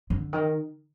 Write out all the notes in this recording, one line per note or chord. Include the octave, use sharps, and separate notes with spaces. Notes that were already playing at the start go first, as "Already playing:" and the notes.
D3
D#3